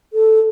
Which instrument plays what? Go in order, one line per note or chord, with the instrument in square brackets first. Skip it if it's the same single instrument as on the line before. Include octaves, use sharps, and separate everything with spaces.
[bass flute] A4